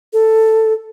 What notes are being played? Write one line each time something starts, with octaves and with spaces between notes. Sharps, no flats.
A4